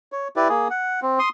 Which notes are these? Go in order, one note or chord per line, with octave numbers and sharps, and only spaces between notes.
C#5
E4 G4 B4 D5
A#3 G#4
F#5
C4
C6 D#6